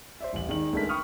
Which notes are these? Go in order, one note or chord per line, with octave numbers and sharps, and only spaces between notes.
C5 D5 E5
D#1 A1 F#7
D#3 G#3 D5 F#7
C#2 G#3 A3 D4 A#4 B6
G5 B5 C#6 D#6 F6